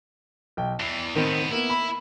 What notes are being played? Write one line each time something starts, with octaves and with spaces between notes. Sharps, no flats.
B1 G5
E2 E3 C7
A2 D#3 B3 C4
A#3 B3 E4
B5